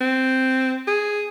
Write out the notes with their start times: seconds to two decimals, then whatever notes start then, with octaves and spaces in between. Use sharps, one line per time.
0.01 C4
0.88 G#4